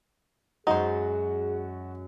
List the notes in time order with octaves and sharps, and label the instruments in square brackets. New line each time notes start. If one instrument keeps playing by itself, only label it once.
[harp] F#2 G#3 A6 [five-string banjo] D#4 C5 [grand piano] F#4 [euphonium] G#4